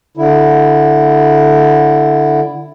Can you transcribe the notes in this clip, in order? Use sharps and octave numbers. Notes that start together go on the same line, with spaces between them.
D3 E4